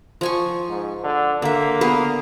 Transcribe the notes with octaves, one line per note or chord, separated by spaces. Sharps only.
F3 G#5 C#6
G#2
D3
D3 A#3 E5
B3 G#4 B4